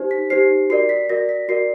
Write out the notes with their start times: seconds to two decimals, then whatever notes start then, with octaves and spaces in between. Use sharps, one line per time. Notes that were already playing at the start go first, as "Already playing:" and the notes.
Already playing: D#4 G4 C5
0.11 B6
0.30 D#4 G4 C5 C7
0.70 F#4 A#4 D5 C7
0.89 B6
1.09 F#4 A#4 D5 A#6
1.29 B6
1.49 F#4 A#4 D5 C7